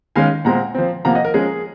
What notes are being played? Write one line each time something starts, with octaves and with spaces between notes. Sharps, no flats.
D#3 G#3 C#4 F5 G#5
A#2 G#3 C4 F#5 A#5
F3 C4
C3 F3 A#3 F#5 A#5
D#5 F#5
A#4
F3 G#3 C#4 G#4